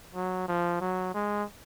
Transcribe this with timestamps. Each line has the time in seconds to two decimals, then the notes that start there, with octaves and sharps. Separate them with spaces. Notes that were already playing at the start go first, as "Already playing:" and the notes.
0.15 F#3
0.48 F3
0.81 F#3
1.14 G#3